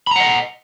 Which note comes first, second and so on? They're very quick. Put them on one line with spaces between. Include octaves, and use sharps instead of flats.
B5 A#5 F#5 D#5